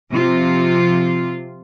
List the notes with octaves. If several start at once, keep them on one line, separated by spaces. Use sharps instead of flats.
C3 F3 F4